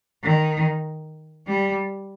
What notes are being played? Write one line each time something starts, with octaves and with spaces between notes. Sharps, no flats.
D#3
G3